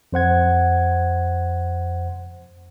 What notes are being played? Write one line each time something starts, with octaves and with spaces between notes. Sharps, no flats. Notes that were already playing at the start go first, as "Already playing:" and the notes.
F2 C5 F#5 G#6